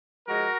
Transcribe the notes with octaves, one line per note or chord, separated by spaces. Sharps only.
F3 G#3 F#4 A#4